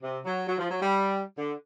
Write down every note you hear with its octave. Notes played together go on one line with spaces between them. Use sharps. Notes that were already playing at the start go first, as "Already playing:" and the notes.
C3
F#3
F#3
F3
F#3
G3
D3